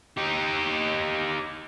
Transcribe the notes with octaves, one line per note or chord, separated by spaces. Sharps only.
D#4 G4